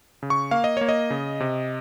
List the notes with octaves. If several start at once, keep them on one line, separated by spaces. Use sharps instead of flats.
C#3
C#6
A#3 F5
D#5
A#3 C#5
D#5
C#3
C3